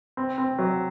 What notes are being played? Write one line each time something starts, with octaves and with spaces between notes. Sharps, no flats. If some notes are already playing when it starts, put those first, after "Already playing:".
C4
C4
F#3